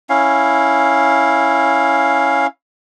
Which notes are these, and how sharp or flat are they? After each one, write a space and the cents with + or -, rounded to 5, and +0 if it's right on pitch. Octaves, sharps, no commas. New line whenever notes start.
C#4 +0 E4 +0 F5 +10